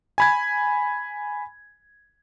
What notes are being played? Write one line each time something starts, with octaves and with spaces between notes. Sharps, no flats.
G#5 B5 G#6